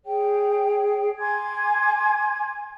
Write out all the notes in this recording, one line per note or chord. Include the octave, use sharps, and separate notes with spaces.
G#4 C#5 G5
G#5 C6 D6 G#6